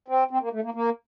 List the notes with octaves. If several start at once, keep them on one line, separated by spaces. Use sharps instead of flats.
C4
C4
A#3
A3
A#3
A#3